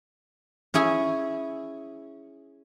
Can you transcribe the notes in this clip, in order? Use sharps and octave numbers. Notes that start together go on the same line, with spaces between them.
C#4 E4 G#4 G#5